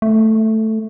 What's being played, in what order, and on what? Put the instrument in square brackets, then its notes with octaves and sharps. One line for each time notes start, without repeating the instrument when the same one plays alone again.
[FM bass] A3